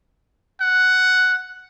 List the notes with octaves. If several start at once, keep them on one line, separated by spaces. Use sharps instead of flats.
F#5